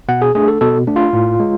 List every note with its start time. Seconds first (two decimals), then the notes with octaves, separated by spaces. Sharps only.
0.09 B2 F#5
0.22 G#4
0.35 A3 D4 G#4
0.48 A4
0.61 B2 A4
0.87 A3 D4
0.96 F4
1.13 A2
1.40 G#3